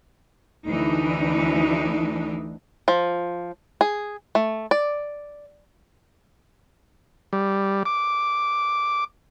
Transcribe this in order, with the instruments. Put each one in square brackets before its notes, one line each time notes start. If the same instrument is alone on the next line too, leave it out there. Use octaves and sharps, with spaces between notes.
[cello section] D2 E3 D4 D#4
[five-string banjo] F3
G#4
A3
D5
[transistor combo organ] G3
D6